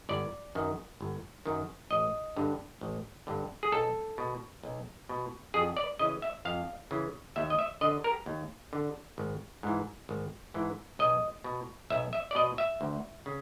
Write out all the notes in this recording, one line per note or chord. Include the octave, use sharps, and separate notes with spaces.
G1 D5
F#2 D#3
G1
F#2 D#3
A1 D#5
G2 D3
A1
G2 D3
G#4
B1 A4
B2
B1
B2
F2 G#4
D5
C#3 E3 D#5
E5
F2 F5
C#3 E3
D#2 E5
D#5
E5
D3 D#5
A#4
D#2
D3
G#1
G#2 E3
G#1
G#2 E3
B1 D#5
B2
B1 E5
E5
D5
B2 D#5
E5
D2
C#3